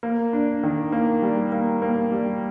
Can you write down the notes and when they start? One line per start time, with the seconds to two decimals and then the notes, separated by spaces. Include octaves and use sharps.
0.03 A#3
0.33 D4
0.63 D#3
0.92 A#3
1.22 G3
1.52 A#3
1.82 A#3
2.12 G3